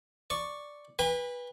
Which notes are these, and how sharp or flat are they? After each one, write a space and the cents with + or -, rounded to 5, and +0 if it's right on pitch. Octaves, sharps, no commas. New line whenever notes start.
D5 +0 C#6 +0
B4 -15 G#5 -45 B5 +0